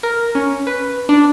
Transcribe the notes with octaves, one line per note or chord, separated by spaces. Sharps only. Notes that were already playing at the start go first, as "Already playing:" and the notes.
A#4
C#4
B4
D4